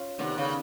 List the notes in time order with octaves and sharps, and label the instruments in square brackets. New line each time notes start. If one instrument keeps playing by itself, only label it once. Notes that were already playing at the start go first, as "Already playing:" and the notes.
Already playing: [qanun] C#4 F4
[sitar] C3 [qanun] D#3 G3 B3 D4
[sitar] C#3